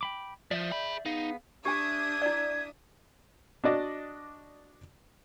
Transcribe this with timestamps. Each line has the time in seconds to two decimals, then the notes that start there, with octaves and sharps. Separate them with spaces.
0.01 G5 B5 D6
0.51 F3 D5 E5 G6
0.72 G#4 B5
1.06 B3 D#4 G#4 F5
1.65 D4 G4 E5 G#5 D#6 G#6
2.22 E4 D5
3.64 D4 F#4 D5 D#5